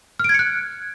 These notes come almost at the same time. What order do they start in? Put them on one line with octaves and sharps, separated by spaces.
F6 D7 G#6 C#7 F#6